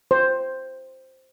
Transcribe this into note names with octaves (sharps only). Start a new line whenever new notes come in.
C5